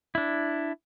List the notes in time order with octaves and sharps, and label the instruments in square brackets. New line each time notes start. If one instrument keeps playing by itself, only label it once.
[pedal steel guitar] D4 E4